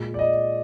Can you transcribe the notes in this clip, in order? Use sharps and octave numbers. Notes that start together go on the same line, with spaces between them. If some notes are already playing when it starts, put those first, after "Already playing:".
Already playing: A#2 G#3
D5
D#5